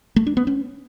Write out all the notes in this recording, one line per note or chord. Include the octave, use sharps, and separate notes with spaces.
A3
D4
B3
C#4